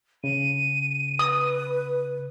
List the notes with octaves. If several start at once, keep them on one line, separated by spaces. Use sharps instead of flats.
C#3 D#7
B4 D#6